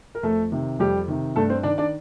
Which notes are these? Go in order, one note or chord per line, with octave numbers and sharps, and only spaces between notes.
A#4
F2 A3 A4
C3 D#3
F2 G3 G4
C3 D#3
G2 A3 A4
C4 C5
D#3 D4 D5
D4 D5